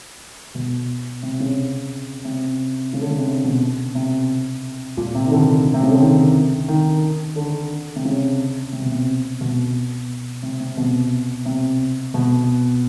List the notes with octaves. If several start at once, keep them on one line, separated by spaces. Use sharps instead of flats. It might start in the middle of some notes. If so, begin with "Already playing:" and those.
B2
C3
C#3
C3
C#3
D3
C#3
C3
B2
C3
A#2
C3
D#3
D3
C3
C#3
D3
D#3
D#3
D3
C3
C#3
C3
B2
C3
B2
C3
C3
B2
C3
B2